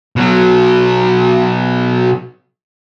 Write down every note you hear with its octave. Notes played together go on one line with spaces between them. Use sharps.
B2 F#3